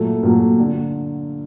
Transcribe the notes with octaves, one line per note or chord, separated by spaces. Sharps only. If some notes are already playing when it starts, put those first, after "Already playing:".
Already playing: A#2 F#3 A3
A#2 F#3 A3
D3